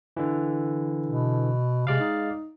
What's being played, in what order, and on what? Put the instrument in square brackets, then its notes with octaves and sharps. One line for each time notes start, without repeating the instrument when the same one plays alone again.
[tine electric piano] D3 E3
[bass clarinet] B2
[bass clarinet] C3 [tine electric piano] G#3 D5 F5
[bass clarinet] D#4